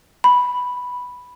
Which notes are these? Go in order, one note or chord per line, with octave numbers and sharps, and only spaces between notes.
B5